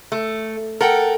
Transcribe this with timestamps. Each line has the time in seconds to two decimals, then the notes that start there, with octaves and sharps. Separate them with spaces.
0.12 A3
0.81 A4 A#4 F#5 G5